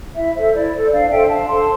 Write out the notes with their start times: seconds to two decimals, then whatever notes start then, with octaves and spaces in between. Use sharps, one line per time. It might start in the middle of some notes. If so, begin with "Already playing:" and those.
0.14 E4 E5
0.33 A4 C5 E5
0.52 E4 D5
0.71 A4 C5
0.91 D4 D5 F5
1.09 A4 C5 E5 G5
1.28 D4 F5 A5
1.47 A4 C5 A5 C6